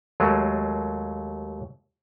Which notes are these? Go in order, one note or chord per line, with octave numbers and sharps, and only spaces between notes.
D#2 F#3 G#3 A3